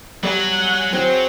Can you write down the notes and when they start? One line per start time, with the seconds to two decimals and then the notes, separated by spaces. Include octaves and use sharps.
0.23 F#3 G3 F#5 G#5
0.93 C4 F#4 G#4